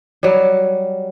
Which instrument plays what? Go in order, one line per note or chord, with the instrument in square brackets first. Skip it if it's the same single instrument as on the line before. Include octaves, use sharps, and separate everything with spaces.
[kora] F#3 G3